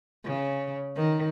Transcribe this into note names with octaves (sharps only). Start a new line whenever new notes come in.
C#3
D#3